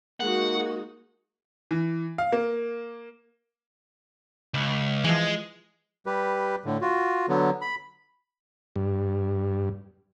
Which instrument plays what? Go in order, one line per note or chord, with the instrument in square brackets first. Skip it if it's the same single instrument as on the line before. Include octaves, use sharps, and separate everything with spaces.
[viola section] G#3 D#4 F#4 [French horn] A#3 [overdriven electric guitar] F#5
[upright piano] E3
F5
A#3
[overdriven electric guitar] C#2
[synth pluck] E3 F3 [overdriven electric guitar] G#3
[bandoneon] G3 G4 B4
A2 D3
F4 F#4
D3 F#3 B3
B5
[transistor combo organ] G2